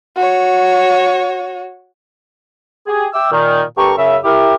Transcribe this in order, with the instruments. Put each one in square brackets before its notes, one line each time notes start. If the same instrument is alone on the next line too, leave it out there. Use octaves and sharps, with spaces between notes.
[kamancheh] F#4 C#5
[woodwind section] G4 G#4
E5 G5 D6 E6
A#2 D#3
G2 G4 A4 A#4 C#6
F#2 C#3 E5
E4 G4 A#4